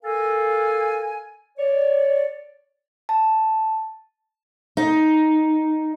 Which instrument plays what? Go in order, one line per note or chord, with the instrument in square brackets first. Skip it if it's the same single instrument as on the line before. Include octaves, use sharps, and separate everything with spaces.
[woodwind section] A4 A#4 F5 G#5
C#5 D5
[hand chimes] A5
[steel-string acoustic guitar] D#4